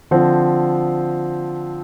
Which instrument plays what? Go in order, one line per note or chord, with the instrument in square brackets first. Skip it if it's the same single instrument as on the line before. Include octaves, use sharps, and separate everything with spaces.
[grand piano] D3 F3 C4